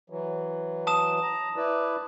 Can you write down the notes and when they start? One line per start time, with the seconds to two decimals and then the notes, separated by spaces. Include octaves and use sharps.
0.10 E3 F#3
0.87 A5 D#6 E7
1.22 A#5
1.56 E4 B4 D5